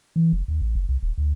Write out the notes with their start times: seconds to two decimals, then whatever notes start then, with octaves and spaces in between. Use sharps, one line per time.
0.16 E3
0.32 F1
0.48 D#2
0.62 A1
0.75 F#1
0.89 C2
1.03 D#1
1.18 D2